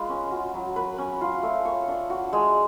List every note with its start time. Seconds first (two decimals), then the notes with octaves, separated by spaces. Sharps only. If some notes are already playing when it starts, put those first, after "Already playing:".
Already playing: G#3 F4 B4
0.09 C#4
0.31 F#4
0.54 F#3
0.76 B4
0.98 C#4
1.21 F4
1.43 A3
1.65 C#5
1.88 D4
2.10 F#4
2.33 G#3